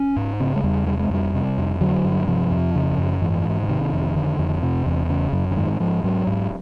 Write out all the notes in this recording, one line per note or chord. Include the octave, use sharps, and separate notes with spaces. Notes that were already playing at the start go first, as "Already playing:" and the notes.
Already playing: C#4
G#2
C#3 C4
G#3
E2 G3
C3 G3
G#3
F2 G3
C3
F2
D3 F#3
G2
C3 F3
F2
C#3
F#2
G#2 E3
G#2
D3
C3 D#3
F2
D3
F2
C3
E2
C#3
F#2
D3
G#2 D#3
G#2 F3
G#2 F#3
G#2